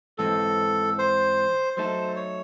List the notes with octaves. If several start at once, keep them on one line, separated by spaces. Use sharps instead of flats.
G#2 E3 C4 A4
C5
F#3 A3 D#4 A4 C5
C#5